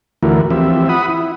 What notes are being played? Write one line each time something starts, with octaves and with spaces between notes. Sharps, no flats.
D2 E3 A3 E4 F#4 A#4
E3 F3 C4 G4 E5
F#5 B5 D#6
E4